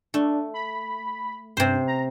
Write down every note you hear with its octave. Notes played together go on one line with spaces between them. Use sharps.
A3 D4
B5
G2 C3 C5
A#5